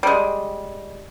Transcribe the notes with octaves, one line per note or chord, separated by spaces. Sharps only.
G3 G#3